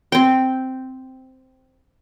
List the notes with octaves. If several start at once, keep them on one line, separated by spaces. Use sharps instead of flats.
C4 G5